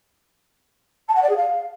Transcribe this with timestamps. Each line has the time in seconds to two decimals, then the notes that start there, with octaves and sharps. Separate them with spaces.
1.08 A5
1.15 F#5
1.22 D5
1.29 G#4
1.36 F5